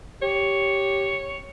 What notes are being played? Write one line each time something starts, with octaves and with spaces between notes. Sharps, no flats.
G4 C#5